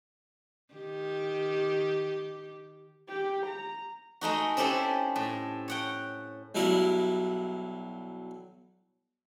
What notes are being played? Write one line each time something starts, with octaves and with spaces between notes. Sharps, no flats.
D#3 G4
G4
A#5
G#3 A3 D#4 F#4
C4 C#4 E4 G4 A4 G#5
A2
C#5 F#5 G5
B1 F#3 G3 E4 A#4